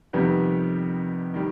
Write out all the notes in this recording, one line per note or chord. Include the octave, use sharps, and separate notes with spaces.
F2 C3 D#3 G3 B3
D#3 G3